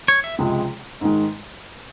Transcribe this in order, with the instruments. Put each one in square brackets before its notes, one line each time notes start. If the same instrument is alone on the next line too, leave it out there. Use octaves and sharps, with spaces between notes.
[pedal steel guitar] C#5
E5
[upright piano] C#2 C3 F3 G#3
G#2 D#3 G#3